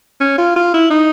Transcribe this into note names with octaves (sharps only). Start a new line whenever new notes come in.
C#4
F4
F4
E4
D#4